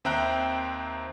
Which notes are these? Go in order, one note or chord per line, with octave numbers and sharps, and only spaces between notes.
D#2 C4 E5 G5 A#5 F#6